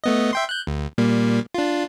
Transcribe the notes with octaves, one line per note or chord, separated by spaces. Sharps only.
A3 B3 D#5
E5 G5 C6
F#6 G6
D2
A#2 G3 A#3
D4 F4